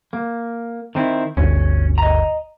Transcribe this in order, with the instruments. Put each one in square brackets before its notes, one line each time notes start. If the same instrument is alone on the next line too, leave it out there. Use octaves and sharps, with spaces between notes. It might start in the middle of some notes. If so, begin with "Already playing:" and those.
[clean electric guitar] A#3
D#3 C4 E4
[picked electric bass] G1 D2 [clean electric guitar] C#4
[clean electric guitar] D#5 A#5